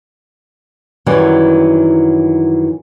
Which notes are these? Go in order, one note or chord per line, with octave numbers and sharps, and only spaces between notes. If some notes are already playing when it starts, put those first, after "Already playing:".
F#2 D#3 E3 F#3 G3